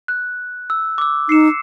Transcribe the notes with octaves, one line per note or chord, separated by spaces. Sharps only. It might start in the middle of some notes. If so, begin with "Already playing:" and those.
F#6
E6
D6 E6
D#4 C7 C#7 E7